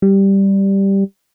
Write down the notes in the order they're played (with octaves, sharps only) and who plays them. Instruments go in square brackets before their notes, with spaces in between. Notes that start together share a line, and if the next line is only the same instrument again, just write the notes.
[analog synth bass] G3